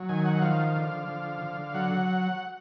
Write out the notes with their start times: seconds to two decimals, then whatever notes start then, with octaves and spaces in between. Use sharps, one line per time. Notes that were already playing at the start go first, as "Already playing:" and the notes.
Already playing: F#3
0.09 D#3 G#5
0.26 F#5
0.42 F3 F5
0.76 D3
1.08 F3
1.42 D3
1.74 F#3 F#5